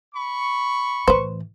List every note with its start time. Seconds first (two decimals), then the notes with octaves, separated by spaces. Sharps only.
0.14 B5 C#6
1.08 A2 E3 B4 C5